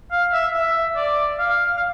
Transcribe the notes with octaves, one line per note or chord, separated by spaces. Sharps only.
F5
E5
E5
D5
F5
F5